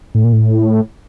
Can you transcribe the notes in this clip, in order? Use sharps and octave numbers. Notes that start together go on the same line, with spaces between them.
A2
A#2
A2